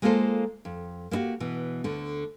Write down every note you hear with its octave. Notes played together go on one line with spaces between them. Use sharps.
G#3 A#3 F4 G#4 A4 C5
F2
A#3 B3 E4 F#4 G4
B2 E3
D2 D3